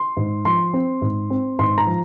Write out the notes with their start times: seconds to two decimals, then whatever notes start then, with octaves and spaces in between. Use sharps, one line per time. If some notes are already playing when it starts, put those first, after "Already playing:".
Already playing: C6
0.17 G#2
0.45 F3 C6
0.74 C4
1.02 G#2
1.30 C4
1.59 G#2 C6
1.78 A#5
1.87 F3